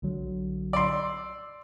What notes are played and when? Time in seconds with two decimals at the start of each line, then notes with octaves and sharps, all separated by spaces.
0.02 B1 D3 F#3
0.73 D5 C6 E6